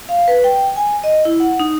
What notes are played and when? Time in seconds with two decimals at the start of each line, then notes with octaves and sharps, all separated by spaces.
0.09 F5
0.28 B4
0.44 G5
0.76 G#5
1.04 D#5
1.25 E4
1.40 F#5
1.60 D#4